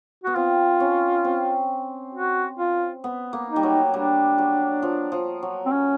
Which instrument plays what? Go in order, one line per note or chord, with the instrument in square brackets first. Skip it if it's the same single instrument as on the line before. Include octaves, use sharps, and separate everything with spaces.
[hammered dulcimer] B3 [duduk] F#4
[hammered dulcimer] C4 [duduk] F4
[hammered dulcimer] C#4
C4
[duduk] F#4
F4
[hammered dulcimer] B3
A#3
[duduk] D#4
[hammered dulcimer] G3
F#3
[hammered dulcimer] G3 [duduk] D4
[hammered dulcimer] F#3
F3
F3
F#3
[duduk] C4
C#4